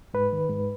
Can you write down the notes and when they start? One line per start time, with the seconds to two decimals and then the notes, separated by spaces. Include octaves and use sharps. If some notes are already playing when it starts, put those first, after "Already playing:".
0.14 G#2 B4
0.33 D#3
0.50 G#2